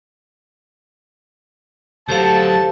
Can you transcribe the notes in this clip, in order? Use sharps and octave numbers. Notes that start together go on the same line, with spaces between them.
D2 F#3 G4 A4 C5 F5 A5